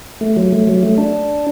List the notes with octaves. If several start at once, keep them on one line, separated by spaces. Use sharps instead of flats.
A3
F#3
A3
F#3
A3
D4